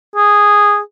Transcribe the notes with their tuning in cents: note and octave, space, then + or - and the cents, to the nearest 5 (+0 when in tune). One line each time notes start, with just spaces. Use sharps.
G#4 -10